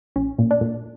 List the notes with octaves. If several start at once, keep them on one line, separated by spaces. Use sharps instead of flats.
A#1 C#4
A#2
D4
A#2